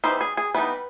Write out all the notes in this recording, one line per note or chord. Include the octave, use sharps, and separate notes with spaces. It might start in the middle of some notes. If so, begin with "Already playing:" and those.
E3 G3 B3 D#4 C5
G#4
G#4
E3 G3 B3 D#4 B4